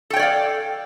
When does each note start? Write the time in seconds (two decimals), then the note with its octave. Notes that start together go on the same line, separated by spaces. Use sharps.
0.10 A4
0.13 G5
0.16 C#5
0.19 D5
0.22 F5